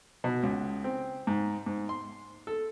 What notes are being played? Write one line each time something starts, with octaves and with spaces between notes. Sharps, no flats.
B2
C#2
C4
G#2
G#2
C6
A4